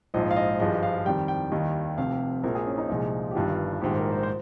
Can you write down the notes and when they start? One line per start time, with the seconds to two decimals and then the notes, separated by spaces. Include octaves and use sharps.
0.14 A#1 G#2 F3 D#5
0.31 F5
0.37 D#5
0.60 G#1 G2 F3 G#3 D#5
0.83 F5
1.05 F2 D#3 G3 G5
1.28 G5
1.51 D#2 D#3 G3 D#5
1.98 F1 F2 C3 F5
2.43 A#1 A#2 G#3 A#4
2.55 G#4
2.67 C#4
2.78 D#4
2.89 C2 A#2 F3 G#3
3.31 G4
3.35 G1 G2 D#3 G3 F4
3.81 A#1 G#2 D#3 G4
3.97 A#4
4.12 C5
4.23 C5